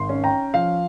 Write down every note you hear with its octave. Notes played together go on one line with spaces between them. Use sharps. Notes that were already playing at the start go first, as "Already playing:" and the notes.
Already playing: G#1 C6
C#4
G5 A#5
F3 F5